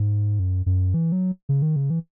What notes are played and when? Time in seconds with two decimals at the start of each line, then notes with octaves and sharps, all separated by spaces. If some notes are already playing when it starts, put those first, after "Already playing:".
Already playing: G#2
0.39 F#2
0.66 F#2
0.94 E3
1.12 F#3
1.49 C#3
1.62 D#3
1.76 C#3
1.90 E3